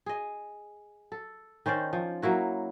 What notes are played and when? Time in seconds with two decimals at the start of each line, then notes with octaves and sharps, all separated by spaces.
0.06 G#4 D#5
1.12 A4
1.66 D#3 C#4 C5 D5
1.93 F3
2.22 F#3 A#3 E4 F#4